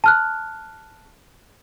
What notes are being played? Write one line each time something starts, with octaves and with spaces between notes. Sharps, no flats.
A5 F6 F#6